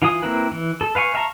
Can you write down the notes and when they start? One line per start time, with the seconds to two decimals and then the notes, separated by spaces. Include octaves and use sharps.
0.02 E3 F4 F5 G#5 D#6
0.22 A#3 C4 E4 A#4 B4
0.52 E3
0.81 A4
0.95 B4 F5 G#5 C#6
1.14 E5 F5 A5 A#5 C#6